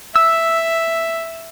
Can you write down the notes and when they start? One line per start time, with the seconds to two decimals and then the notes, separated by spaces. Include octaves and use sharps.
0.16 E5 E6